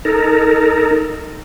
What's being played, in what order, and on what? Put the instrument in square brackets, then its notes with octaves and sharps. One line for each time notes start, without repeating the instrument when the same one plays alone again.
[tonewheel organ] D#4 A4 A#4